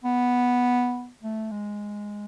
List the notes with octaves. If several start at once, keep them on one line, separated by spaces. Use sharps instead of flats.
B3
A3
G#3